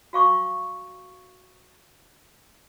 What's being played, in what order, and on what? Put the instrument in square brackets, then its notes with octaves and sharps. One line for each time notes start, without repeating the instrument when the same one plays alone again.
[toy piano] F#4 F5 C#6 D6